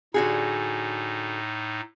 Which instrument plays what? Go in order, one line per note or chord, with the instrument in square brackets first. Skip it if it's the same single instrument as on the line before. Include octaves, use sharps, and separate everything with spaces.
[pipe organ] A2 D#4 [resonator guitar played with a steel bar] D3 F#4 G#4